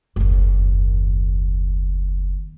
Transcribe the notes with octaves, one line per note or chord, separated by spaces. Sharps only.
F#1 D#2